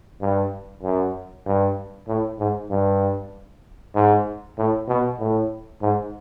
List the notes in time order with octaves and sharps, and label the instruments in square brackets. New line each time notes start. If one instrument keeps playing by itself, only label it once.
[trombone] G2
F#2
G2
A2
G#2
G2
G#2
A2
B2
A2
G#2